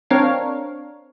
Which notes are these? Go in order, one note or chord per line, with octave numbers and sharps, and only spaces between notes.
C4 D4 A#4 C#5 F5